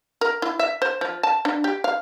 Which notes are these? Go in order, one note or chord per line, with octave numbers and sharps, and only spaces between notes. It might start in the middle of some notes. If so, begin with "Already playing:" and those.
A#4
E4
E5
C5
F3
A5
D4
G4
F5